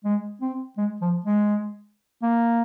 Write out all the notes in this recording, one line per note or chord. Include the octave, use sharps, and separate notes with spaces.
G#3
C4
G#3
F3
G#3
A#3